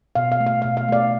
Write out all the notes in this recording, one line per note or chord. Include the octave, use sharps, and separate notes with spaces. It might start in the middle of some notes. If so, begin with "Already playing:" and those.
B2 F5
F5
A3
F5
B2 F5
F5
A3 D5 F5